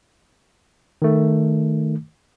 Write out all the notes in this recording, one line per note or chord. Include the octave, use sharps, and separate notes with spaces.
D#3 A3